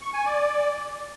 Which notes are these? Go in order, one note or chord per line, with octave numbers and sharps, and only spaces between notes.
C#6
G#5
D5